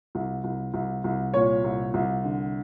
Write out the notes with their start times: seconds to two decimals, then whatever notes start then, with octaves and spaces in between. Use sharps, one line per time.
0.15 C2
0.44 C2
0.74 C2
1.04 C2
1.34 A#2 C#5
1.64 C2
1.94 C2
2.24 D3